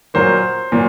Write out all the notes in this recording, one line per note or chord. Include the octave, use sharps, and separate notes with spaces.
A#2 F#3 A#3 C5
A#2 F#3